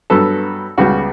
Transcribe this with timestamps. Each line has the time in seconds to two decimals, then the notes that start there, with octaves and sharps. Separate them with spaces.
0.10 G2 F#3 B3 A4
0.78 C#2 C#3 G3 B3 F#4